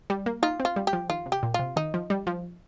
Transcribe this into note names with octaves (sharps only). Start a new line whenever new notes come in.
G3
A#3
D#4 F4
C4
F4
G3
G4
F3
D#3 F4
C3
G4
A#2
C3 F4
D#3 D#4
F3
G3
F3